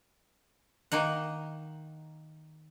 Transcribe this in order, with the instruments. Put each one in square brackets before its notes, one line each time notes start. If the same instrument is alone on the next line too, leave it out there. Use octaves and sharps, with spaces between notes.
[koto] D#3 A#3 D#4 F#5